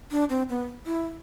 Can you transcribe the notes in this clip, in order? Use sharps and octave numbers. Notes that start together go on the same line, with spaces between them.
D4
C4
B3
E4